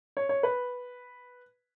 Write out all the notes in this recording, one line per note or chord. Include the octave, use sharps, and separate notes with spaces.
C#5
C#5
B4